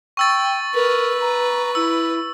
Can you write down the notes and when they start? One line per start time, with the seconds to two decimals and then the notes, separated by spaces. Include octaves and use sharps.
0.17 G5 C#6 E6 A6
0.74 A#4 B4
1.20 A#5
1.75 E4 E6